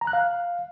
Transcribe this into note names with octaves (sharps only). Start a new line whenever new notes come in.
A#5
F#6
F5